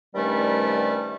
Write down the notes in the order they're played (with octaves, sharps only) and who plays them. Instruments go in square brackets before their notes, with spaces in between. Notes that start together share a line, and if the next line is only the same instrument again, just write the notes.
[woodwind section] G2 C3 D#3 G3 A3 C#4